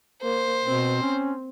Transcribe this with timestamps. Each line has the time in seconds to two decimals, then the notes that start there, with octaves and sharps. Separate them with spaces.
0.22 A#3 C5
0.65 B2 C4
1.02 C#4